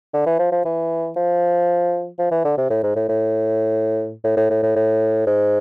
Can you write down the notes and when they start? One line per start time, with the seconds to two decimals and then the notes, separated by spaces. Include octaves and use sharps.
0.13 D3
0.26 E3
0.39 F3
0.52 F3
0.65 E3
1.16 F3
2.19 F3
2.32 E3
2.45 D3
2.58 C3
2.70 A2
2.83 G#2
2.96 A2
3.09 A2
4.24 A2
4.37 A2
4.50 A2
4.63 A2
4.76 A2
5.27 G#2